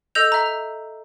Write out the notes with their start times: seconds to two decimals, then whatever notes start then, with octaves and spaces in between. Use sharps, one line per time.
0.15 A4 D#5 E6 G6 F7
0.32 E5 A#5